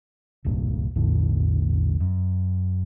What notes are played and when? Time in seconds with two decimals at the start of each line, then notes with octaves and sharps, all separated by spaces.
0.45 D#1 C2 G2 A#2
0.95 A#1 E2 A2 D3
2.00 F#2